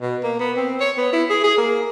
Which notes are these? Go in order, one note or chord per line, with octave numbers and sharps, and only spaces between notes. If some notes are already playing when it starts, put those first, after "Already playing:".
B2
A#3
B3
C4
C#5
B3
E4
G#4
G#4
A#3